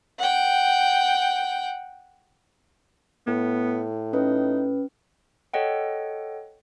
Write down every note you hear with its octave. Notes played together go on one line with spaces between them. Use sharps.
F#5 G5
A2 B3
C#4 D#4 B4
A4 C#5 D#5 F#5 G5